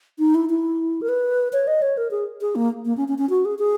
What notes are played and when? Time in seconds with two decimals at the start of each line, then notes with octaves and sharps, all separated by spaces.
0.19 D#4
0.35 E4
0.49 E4
1.02 A#4
1.09 B4
1.53 C#5
1.67 D#5
1.82 C#5
1.97 A#4
2.11 G#4
2.41 G#4
2.55 A#3
2.85 A#3
2.97 C#4
3.08 C#4
3.18 C#4
3.30 F#4
3.45 G#4
3.59 G#4